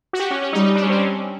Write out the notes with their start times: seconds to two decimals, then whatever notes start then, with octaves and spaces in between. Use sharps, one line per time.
0.13 F#4
0.20 G4
0.31 C#4
0.42 C#4
0.53 G3 D#4
0.64 D#4
0.75 D4
0.82 C#4
0.90 C4
0.97 C#4